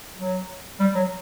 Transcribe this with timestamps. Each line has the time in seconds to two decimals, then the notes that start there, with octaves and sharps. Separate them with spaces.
0.18 F#3
0.80 G3
0.95 F#3